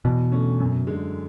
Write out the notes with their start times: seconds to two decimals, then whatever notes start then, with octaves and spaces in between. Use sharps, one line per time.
0.05 E2 B2
0.32 D3 A3 C#4
0.60 F#2
0.87 D3 G#3